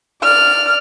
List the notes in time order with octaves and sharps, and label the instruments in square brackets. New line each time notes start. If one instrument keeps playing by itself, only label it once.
[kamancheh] D5 F6